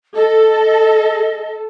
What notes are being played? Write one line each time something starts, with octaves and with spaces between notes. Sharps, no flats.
A4 D#5